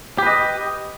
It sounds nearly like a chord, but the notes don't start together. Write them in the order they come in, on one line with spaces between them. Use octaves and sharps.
G4 B4 D#5